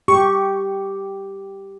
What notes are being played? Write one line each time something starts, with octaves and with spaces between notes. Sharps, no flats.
G4 C#6